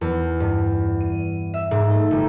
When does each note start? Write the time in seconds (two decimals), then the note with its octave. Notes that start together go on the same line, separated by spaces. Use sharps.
0.01 E2
0.40 G2
1.01 D#7
1.54 E5
1.71 G#2
1.90 A3
2.11 G1